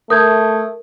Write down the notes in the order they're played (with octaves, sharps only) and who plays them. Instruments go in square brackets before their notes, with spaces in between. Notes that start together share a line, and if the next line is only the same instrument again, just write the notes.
[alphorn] A3 [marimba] A#4 [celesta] D#6 G6 G#6